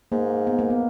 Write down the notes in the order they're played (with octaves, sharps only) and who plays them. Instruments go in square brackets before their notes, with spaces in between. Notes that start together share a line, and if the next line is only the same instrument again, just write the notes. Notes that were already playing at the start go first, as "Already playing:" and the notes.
[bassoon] G#2 [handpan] A#3
[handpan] B3
A#3
B3